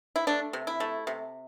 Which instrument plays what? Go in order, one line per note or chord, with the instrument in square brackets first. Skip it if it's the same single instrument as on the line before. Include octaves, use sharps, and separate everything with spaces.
[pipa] E4
A3 D4
C3
E4
A3
C3